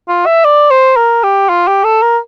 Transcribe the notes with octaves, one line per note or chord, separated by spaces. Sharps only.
F4
E5
D5
C5
A#4
G4
F4
G4
A4
A#4